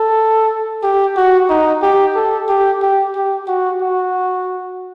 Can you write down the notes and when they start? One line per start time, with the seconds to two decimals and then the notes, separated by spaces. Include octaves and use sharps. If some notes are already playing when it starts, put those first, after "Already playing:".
Already playing: A4
0.83 G4
1.16 F#4
1.50 D#4
1.83 G4
2.16 A4
2.49 G4
2.82 G4
3.15 G4
3.48 F#4
3.81 F#4